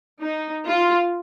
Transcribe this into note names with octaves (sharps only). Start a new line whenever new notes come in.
D#4
F4